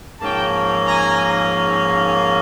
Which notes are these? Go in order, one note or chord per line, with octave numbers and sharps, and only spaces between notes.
G#2 F3 A#3 C#4 G5 A5
G#5 A#5